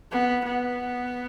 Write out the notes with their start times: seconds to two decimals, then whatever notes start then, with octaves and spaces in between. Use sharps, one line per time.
0.12 B3
0.45 B3